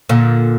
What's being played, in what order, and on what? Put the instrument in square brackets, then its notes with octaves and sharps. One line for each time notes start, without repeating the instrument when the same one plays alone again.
[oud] A#2 D3